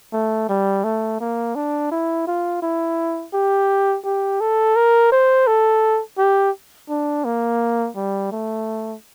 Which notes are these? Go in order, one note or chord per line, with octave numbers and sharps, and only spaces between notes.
A3
G3
A3
A#3
D4
E4
F4
E4
G4
G4
A4
A#4
C5
A4
G4
D4
A#3
G3
A3